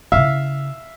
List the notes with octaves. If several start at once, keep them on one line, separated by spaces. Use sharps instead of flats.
C#3 E4 E5 F5